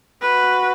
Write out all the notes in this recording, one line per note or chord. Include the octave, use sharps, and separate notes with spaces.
F#4 B4